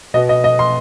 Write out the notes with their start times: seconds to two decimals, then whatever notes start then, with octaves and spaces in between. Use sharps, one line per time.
0.14 B2 B3 D#5
0.29 D#5
0.44 D#5
0.59 C6